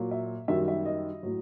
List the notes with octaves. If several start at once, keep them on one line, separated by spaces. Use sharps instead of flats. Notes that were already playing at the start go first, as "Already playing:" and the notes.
Already playing: A#2 F#3
E5
F#2 D#3 G3 E5
E5
D#5
A2 F#3